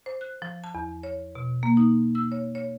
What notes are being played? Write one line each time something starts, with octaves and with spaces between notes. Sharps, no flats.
C5
F#6
F3
A5
E2
C#5
B2
A#3
D#4
E6
C#5
C#5